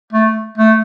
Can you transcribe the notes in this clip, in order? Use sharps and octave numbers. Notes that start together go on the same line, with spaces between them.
A3
A3